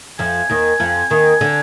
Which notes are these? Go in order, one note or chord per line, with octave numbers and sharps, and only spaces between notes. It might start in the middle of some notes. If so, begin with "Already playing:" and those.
F2 F3 G#5
D#2 D#3
F2 F3
D#2 D#3
D3